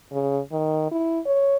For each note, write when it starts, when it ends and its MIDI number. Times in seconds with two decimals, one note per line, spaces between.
0.12 0.40 49
0.52 0.90 51
0.91 1.19 64
1.26 1.57 73